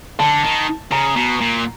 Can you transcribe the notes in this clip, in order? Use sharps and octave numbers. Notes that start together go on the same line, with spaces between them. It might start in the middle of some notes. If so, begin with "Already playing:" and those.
D3 A5
D#3
C#3 A#5
B2
A#2